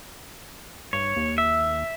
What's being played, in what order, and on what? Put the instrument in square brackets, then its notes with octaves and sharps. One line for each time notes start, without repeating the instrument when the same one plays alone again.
[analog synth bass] G2 [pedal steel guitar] C#5
[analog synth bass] D#2
[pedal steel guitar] E5